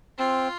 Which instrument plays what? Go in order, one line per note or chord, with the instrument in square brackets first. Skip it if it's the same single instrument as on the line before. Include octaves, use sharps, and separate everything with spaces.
[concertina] C4 [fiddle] F4